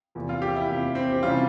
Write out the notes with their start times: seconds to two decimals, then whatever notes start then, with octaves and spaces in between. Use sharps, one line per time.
0.15 E2 C3 F3 A#3
0.29 F4
0.42 G4
0.56 E4
0.69 E2 C3 F3 A#3
0.95 C4
1.12 G4
1.23 C3 E3 G3 C#4 F4